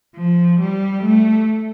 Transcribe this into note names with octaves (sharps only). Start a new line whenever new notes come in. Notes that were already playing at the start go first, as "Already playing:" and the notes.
F3
G3
A3